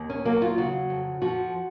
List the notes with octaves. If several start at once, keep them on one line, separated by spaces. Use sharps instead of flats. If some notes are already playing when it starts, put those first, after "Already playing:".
Already playing: D#2
C#4
F#3 A#3
F4
C#3 F#4
F2
F3 F#4